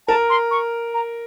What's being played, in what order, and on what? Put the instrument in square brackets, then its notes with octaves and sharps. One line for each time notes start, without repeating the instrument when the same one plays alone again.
[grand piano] A#4 [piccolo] A5
[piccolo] C6
C#6
A#5